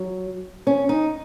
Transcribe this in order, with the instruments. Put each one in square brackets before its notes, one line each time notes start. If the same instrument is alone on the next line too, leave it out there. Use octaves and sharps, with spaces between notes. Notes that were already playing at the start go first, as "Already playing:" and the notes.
Already playing: [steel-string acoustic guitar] F#3
C#4
D#4